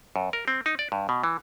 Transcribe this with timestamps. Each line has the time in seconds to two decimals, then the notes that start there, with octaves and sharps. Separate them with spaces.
0.16 F#2
0.33 A#4
0.48 C4
0.66 D#4
0.79 D5
0.92 G2
1.09 B2
1.24 E3